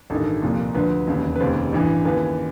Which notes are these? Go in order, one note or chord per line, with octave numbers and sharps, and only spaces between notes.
A1 G2 D#3 A4
C2 A#2 F3
D2 D3 F3 B4
E1 D#2 C#3
B4
F1 D#2 C#3 C5
A1 G2 E3
D#2 C#3 E3 B4